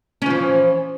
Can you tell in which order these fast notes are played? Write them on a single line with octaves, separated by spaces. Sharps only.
C#4 F3 E3